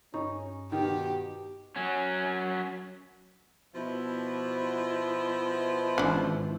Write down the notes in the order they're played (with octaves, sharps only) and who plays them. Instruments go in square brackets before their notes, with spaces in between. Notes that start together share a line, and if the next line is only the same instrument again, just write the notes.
[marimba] G2 A#5 C#6 [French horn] C#4 [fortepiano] D#4
[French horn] B2 [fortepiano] D#3 [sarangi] G4
[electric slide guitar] F#3 C#4
[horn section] B2 E4 [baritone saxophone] F3
[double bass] G#1 E3 [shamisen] C#4 D4